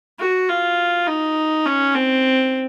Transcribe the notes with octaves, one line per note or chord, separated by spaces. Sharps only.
F#4
F4
D#4
C#4
C4